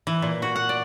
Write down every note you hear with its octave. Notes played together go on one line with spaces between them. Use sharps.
E3
A#2
F#4
F#5
D5